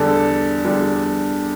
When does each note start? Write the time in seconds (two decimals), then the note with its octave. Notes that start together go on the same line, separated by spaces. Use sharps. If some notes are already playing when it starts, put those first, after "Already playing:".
Already playing: E2 D3 G3 A4
0.65 E2 D3 G3